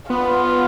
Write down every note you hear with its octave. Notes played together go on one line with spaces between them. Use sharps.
B3 F4
B3